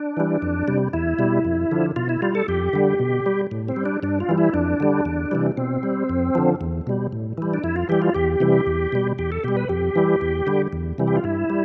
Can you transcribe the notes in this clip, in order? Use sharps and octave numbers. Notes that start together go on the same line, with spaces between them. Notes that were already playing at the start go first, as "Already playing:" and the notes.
Already playing: D4
E3 G3
F2
C3 G3
E2 E4
B2 G3
F2
D3 F3
B2 F4
E4
G3 F4
A4
F2 G4
D3 G3
B2
G3
A2
C4
G3
D4
G2 D4
F4
E3 G3
E4
F2 D4
D3 G3
E2
C3 E3 G3
B2 C4
G3
F2
D3 F3
E2
B2 G3
A2
E3 G3
D4
F2 E4
F4
E3 G3 G4
F4
E2 G4
C3 E3 G3
E2
B2 G3
E2 G4
A4
B2 G3 G4
B4
F2 G4
E3 G3
E2
D3 G3
E2
C3 E3 G3
G4
F4
G2 E4
G3